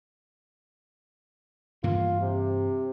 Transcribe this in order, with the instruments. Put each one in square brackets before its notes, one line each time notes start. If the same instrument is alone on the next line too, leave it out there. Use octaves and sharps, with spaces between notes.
[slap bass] G2 E3 A#3 [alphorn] F4
[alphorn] C3